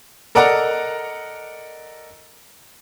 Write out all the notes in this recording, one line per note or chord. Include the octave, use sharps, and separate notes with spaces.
A4 A#4 D5 D#5 F#5 A#5